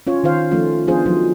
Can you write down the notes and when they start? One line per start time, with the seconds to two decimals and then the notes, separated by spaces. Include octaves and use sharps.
0.07 C#4 F4 C#5
0.24 D#3 F4 C5 F5
0.51 F3 A3 C#4 D#4 F4
0.87 F3 B3 D4 F4 G#4 C5
1.05 F3 F#3 D#4